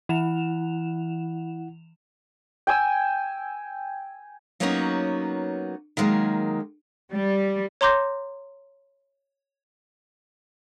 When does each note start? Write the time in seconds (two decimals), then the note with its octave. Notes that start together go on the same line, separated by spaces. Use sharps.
0.09 E3 E4 F#5 E7 F7
2.67 G5 G#5 E6
4.60 F#3 A#3 B3 C#4 D#4 F#4
5.97 D#3 F#3 G#3 A#3
7.13 G3
7.81 C#5 A#5 C6 D6 G6 A#6